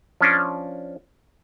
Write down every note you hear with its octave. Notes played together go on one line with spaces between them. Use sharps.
F3 C#4 D4